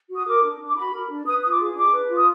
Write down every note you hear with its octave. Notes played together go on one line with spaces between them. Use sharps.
F#4 D#6
A#4 D6
D4
D4
D6
F#4 B5
A#4
D4
B4 D#6
F4 D#6
D6
G#4
D4 D6
B4
F4
D#6